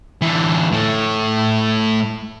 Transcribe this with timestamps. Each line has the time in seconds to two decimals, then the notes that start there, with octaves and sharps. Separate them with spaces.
0.22 D3 E3
0.72 A2 A3